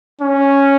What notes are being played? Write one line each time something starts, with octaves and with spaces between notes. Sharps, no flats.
C#4